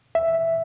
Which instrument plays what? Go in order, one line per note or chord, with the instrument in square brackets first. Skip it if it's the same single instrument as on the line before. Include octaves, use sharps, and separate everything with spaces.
[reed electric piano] E5